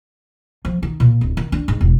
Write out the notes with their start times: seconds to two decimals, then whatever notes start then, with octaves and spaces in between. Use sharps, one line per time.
0.65 F3
0.83 D#3
1.00 A#2
1.21 D1
1.37 D#3
1.52 D4
1.68 G#2
1.81 E1